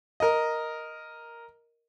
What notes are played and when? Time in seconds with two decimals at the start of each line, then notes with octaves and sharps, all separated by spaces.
0.20 A#4 D#5